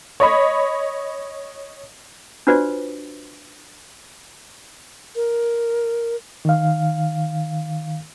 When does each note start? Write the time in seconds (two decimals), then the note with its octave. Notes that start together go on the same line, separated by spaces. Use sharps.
0.20 C#5 D#5 B5
2.47 D4 F4 F#4 B4 C5 D5
5.16 A#4
6.45 D#3 F5